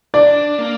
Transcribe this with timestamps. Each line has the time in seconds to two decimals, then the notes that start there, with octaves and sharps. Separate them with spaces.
0.14 D4 D5
0.58 A#3